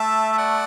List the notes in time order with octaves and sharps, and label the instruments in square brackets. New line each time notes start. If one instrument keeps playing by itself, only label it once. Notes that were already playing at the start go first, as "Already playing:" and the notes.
Already playing: [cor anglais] A3 [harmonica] E5 A5
[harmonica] E5
D5 F#5